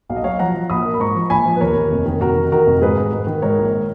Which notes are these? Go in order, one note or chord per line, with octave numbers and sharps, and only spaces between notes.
B1 F5
D#5
F#3 C#5 F5
F3 F#5 A#5
F3
A#1 B5 D#6
A#3
B5
G#2 A#5 C#6
F3
A#1 G#5 B5
F3
B4
D#2 A#4 C#5
D#2
F1
D#3
F1 F#4 A#4
D#3
D#3 F#4 A#4
F1
G#2 G#4 B4
G#2
G#2
D#3
G#2 A#4 C#5
A#1